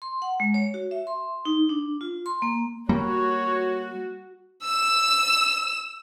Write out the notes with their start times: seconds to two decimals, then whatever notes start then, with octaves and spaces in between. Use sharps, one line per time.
0.02 C6
0.22 F#5
0.40 G#3
0.54 C#5
0.74 F#4
0.91 E5
1.07 C6
1.45 D#4
1.69 D4
2.01 F4
2.26 C6
2.42 A#3
2.89 G3 A#3 F#4 C#5
4.63 E6 E7